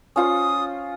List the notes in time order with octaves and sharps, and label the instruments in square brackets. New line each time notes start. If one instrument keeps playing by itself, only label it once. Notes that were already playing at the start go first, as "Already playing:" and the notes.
[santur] C#4 F4 C5 [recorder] D#6